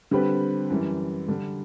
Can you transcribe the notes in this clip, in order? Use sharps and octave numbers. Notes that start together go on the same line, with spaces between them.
D3 G3 C4 G4 B4
F#2 E3 G3
D3 G3 D4